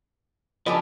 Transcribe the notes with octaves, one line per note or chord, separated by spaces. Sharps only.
F3 F#3 C#4 D4 G4 A4 B4 D#5